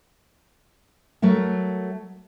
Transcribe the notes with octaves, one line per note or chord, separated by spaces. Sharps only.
F#3 A3 A#4 E5